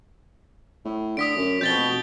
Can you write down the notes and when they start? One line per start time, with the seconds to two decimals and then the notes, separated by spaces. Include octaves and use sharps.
0.85 A2
1.17 D3 D#6 B6 D7
1.37 F#2
1.61 F2 B2 G6 A6 G7
1.77 F1